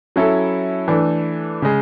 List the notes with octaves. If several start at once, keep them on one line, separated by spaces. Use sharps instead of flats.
F#3 C#4 E4 A4
E3 A3 D4 A4
C#3 G#3